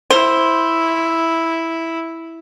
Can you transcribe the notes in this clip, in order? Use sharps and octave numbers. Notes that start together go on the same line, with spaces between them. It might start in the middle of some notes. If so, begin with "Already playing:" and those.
E4 C5